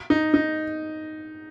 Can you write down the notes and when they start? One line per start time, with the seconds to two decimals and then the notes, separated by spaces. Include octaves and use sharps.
0.10 D#4
0.34 D#4